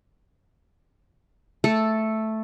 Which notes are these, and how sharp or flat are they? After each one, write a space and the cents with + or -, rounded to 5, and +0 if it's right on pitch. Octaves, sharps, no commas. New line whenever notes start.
A3 +0 A4 +0